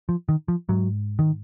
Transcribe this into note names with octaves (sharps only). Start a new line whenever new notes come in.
F3
D#3
F3
G#2 F#3
D#3